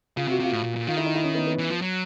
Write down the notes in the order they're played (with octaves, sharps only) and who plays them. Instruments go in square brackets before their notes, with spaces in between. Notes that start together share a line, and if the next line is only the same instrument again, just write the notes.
[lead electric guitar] C#3 [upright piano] F4
[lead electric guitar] C3 [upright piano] F#4
[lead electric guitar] C3 [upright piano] F4
[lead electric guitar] A2
A#2
A#2
[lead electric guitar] D#3 [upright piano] F4
[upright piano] E4
D#4
E4
C#4
B3
B3
[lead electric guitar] E3
F3
F#3